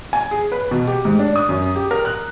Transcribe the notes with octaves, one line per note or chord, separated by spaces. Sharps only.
G#5
G#4
B4
B2
G4
G#2
D4
D#6
F#2
G4
A#4
F#6